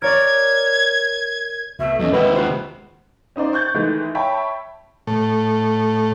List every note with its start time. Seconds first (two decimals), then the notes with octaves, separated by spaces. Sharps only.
0.02 A#4 C#5 D5 G#6
1.79 C2 B2 A3 E5
1.99 E2 F#3 C#4 D#5
2.13 D#2 B2 G#3 C4 E4 B4 D#5 F#5
2.35 C3 F3 F#4 B4 C5
3.36 C#4 D#4 C5 D5
3.53 C#6 F#6 G6 A6
3.74 D#3 E3 G#3 A3
4.15 C#5 E5 G5 A5 B5
5.07 A2